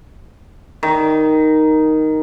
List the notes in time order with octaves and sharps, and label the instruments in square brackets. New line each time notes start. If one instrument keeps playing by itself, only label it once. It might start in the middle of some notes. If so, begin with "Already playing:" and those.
[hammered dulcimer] D#3